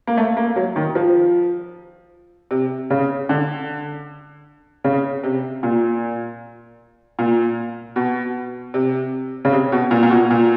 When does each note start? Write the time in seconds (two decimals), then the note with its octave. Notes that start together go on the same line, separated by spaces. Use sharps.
0.07 A#3
0.17 A3
0.37 A#3
0.56 F#3
0.76 D#3
0.95 F3
2.51 C3
2.90 C#3
3.29 D3
4.84 C#3
5.24 C3
5.63 A#2
7.19 A#2
7.96 B2
8.74 C3
9.45 C#3
9.52 C3
9.72 B2
9.91 A#2
10.03 A#2
10.10 B2
10.30 A#2